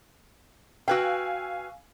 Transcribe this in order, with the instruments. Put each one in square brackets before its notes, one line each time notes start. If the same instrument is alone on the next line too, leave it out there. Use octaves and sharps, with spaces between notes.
[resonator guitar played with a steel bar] F#4 B4 G5 [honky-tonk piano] F5 G#5 E6